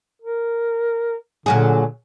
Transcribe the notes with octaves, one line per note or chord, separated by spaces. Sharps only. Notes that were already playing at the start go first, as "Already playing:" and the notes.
A#4
A#2 D3 F#3 G#4